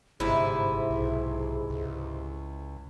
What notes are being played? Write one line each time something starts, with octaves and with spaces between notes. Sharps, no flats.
G1 G#2 C3 E4 G#4
B1
C#2